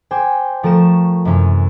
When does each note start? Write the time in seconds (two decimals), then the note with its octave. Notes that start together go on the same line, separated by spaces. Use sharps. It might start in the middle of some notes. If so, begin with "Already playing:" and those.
0.11 C5 G5 G#5 D6
0.63 F3 A3 A#4 C#6 E7
1.25 F#2 C3 E3 C#4